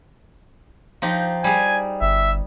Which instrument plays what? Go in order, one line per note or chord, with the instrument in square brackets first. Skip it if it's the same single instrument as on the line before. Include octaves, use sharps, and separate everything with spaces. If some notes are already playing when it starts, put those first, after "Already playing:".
[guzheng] F3 D#4 G4
[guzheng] G3 G#4 [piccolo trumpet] G#5
[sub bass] G1 [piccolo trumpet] E5